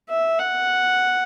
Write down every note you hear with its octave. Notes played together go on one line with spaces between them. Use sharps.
E5
F#5